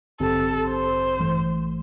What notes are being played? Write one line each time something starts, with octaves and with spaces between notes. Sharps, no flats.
A1 G2 D3 C4 G4 A4
C5
A1 G2 E3 A3